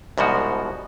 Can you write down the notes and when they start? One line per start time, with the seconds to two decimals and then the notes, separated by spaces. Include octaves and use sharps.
0.18 C2 G#2 B2 F3 F#4